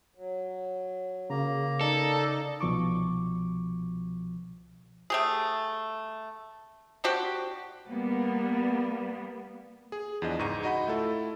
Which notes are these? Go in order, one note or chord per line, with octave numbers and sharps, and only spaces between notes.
F#3
C#3 A#3 A#5
D#4 A4 D5 D#5
C2 B2 F3 C#6 D6
A3 G4 G#4
C4 D4 F#4 G4
G3 A#3 B3
G#4
E2 F3 D4 D#5
C#2 G#2 A#5 C#6 D#7
D#4 F#4 D#5 F#5 B5
A3 E4 F4 A4